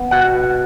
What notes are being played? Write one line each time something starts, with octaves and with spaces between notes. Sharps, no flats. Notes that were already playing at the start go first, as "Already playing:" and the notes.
Already playing: B3
B2 F#5